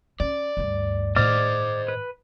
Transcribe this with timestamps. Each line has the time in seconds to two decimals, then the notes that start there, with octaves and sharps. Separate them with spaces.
0.20 C#4 D5
0.57 D2 G2
1.16 A2 D#3 C5 D5 D#5 D6 F6
1.88 B4